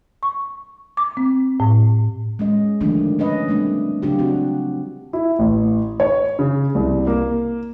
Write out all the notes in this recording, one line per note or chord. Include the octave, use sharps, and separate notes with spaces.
C#6
D6
C4
A2
G#3 C#4 D#5
D3 D#3 F3 A3 D4
C#4 B4 D#5
G3 A3 C4 D4
C#3 F#3 D4 F4 G4
C4 F#4
E4
A1
C#5
C#3
C2
A#3